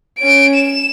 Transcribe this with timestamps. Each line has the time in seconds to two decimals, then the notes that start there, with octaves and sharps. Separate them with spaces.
0.19 C#4 D7
0.56 E7